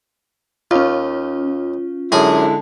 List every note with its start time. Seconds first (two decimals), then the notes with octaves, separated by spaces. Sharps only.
0.71 D#2 C#4 F4
2.12 F#2 D3 G#3 E4 G#4 G#5